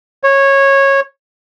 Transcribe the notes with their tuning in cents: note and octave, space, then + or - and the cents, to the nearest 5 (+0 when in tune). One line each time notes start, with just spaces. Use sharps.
C#5 -15